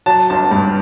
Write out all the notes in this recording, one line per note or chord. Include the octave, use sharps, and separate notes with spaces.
F#3 A5
G1 A5
G2